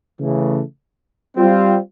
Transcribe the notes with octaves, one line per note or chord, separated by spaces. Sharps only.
C#3 E3 A3
G3 C4 F4